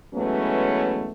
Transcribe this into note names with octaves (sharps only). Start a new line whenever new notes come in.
E3 F#3 G#3 A3 B3 C#4